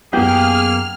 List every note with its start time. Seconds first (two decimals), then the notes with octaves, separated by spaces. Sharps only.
0.13 F#2 A#3 B3 G4 G#4 F6